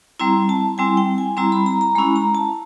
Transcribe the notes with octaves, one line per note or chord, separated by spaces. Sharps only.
G3 C4 E4 A#5
A5
G3 C4 E4 G#5
G5
G#5
G3 C4 E4 A#5
B5
A#5
A#5
G#3 C#4 E4 B5
A#5
A5